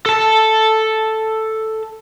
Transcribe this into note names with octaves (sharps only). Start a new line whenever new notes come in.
A4 A5